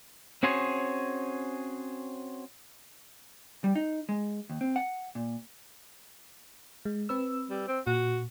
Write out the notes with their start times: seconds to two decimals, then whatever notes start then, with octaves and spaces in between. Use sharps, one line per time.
0.43 C4 C#4 F#4 G#4 C5 C#5
3.64 G3
3.75 D#4
4.09 G#3
4.50 D#2
4.61 C4
4.76 F#5
5.15 A#2
6.85 G#3
7.09 C4 B4 E6
7.50 G3
7.68 C4
7.87 A#2 F#4